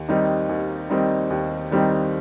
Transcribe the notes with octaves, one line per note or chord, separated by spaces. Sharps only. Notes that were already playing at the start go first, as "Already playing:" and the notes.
Already playing: D#2
D#3 G3 C4 D#4
D#2
D#3 G3 C4 D#4
D#2
D#3 G3 C4 D#4